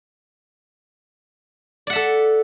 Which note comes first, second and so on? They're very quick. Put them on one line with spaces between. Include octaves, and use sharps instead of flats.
D5 F#5 E5 A4